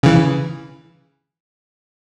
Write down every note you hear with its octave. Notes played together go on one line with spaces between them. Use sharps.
C#3 E3